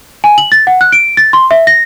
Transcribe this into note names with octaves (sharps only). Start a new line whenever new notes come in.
G#5
F#7
A6
F#5
F#6
D7
A6
C6
E5
A#6